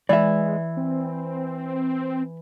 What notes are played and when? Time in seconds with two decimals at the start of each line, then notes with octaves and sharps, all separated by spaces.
0.09 E3 G#3 D5 E5
0.77 C4